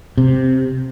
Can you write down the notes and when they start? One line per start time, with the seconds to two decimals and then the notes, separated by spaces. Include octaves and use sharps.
0.18 C3